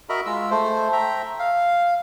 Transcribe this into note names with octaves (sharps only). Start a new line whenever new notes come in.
F#4 A#4 D#5 E5 A#5 B5
G#3 F4 E6
A3 C5
E5 G5 A#5
F5